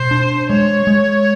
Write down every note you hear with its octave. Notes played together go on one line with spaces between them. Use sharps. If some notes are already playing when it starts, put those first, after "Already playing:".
Already playing: B2 C5
D4
G#3 C#5
G#3